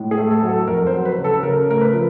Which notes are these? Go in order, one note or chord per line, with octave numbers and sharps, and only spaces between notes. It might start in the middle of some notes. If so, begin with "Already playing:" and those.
Already playing: A2 G#3
G#4
A3
A4
F#3
A4
F2 A#4
C5
F#3
B4
C#3
A4
C#3 A#4
A3 A#4
B4
F3